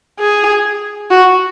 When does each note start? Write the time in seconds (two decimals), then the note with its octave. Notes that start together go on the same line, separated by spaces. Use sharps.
0.20 G#4
1.11 F#4